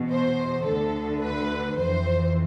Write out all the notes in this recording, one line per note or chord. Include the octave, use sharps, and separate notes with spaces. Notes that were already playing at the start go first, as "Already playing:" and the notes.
Already playing: E2 B2
C5
D2 D3 A4
B4
F2 E3 C5